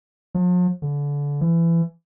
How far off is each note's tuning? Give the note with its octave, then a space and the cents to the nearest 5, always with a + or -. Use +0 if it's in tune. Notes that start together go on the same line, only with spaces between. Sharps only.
F3 +45
D3 -30
E3 +25